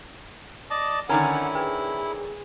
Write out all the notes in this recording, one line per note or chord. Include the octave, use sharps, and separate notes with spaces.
D5 D#5 A5
D3 D#3 C#4 E4 A#4 F#5 G#5 A#5
G#4 B4 G5